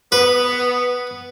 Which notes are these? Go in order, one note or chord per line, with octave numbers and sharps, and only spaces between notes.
B3 B4